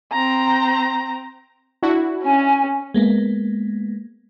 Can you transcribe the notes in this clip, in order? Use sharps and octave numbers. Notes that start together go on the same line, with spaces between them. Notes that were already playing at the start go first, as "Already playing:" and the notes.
C4 A#5
D4 E4 F#4
C#4 G#5
G#3 A#3 B3